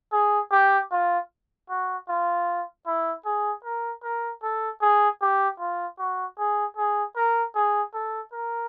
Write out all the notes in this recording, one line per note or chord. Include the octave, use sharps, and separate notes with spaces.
G#4
G4
F4
F#4
F4
E4
G#4
A#4
A#4
A4
G#4
G4
F4
F#4
G#4
G#4
A#4
G#4
A4
A#4